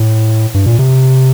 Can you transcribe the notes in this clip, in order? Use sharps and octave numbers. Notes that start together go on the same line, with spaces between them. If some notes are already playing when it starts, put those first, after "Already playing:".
Already playing: A2
G2
A#2
C3